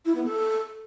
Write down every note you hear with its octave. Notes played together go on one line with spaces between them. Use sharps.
E4
B3
A4